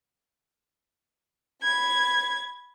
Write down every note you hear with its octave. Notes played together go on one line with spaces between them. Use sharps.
B5 G#6